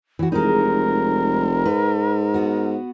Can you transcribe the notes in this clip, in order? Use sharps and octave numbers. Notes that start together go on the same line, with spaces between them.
E3 F#4
F1 G#3 D#4 A#4
G#2 B4
B3 F#4